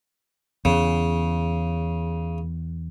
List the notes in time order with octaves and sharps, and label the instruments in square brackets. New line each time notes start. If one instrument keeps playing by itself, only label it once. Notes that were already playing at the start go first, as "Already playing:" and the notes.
[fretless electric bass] E2 [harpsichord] C#3